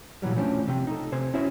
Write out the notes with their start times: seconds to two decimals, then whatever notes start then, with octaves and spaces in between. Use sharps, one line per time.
0.22 A#2 E3 F#3 G3
0.36 E3 F3 A3 C#4 D4
0.68 C3 G5
0.87 D#4 A4
1.12 C3 C5 G#5
1.34 C#4 E4 F#4 E5